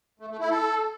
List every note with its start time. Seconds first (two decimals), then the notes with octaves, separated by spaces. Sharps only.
0.20 A3
0.30 A3
0.40 E4
0.50 A4